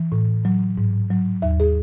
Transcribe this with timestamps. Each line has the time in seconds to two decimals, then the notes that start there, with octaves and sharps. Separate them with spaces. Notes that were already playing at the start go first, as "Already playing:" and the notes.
Already playing: E3
0.12 A2
0.45 F#3
0.78 G#2
1.11 F#3
1.42 D#2 E5
1.60 G#4